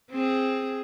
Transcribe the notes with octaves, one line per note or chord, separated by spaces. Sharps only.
C4 G#4